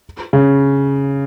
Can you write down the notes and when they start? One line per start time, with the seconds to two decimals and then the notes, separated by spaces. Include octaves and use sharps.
0.33 C#3